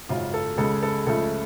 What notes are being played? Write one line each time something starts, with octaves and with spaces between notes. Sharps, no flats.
G#1 F#2 C#3 F4
A4
C#2 C#3 G#3 A4
A4
C#2 C#3 F3 A3 A4